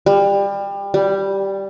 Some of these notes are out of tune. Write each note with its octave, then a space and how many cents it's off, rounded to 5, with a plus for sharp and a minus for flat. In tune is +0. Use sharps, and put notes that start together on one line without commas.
G3 +25
G3 -5